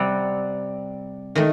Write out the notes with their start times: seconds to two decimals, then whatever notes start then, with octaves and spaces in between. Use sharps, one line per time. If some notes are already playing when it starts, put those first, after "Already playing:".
Already playing: C3 G3 C4 F#5
1.35 D#3 A3 D#5